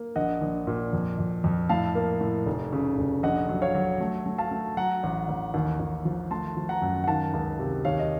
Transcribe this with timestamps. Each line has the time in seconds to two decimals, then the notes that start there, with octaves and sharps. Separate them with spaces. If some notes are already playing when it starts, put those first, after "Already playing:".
Already playing: A#3
0.16 A#1 D#5 F#5
0.41 A#1
0.67 A#2
0.93 F2
1.19 F2
1.44 F2
1.69 A2 F5 A5
1.95 A#3
2.21 A2
2.46 F1
2.73 C#3
2.98 F1
3.23 A#1 D#5 F#5
3.49 F#3
3.62 C#5 F5
3.75 F#3
4.01 A3
4.26 A3
4.38 F5 A5
4.51 A3
4.77 F#3 F#5 A#5
5.03 A1
5.28 A1
5.54 D#2
5.80 D#2
6.05 F3
6.31 A3 A5 C6
6.57 F3
6.69 F#5 A#5
6.82 F#2
7.04 F#5
7.07 D#3 F5 A5
7.33 C#2
7.59 C3
7.85 D#2 C#5 F5
7.99 D#5